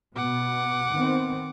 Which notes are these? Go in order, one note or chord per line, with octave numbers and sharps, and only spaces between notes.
B2 B3 F#5 D6
D#3 B3 C4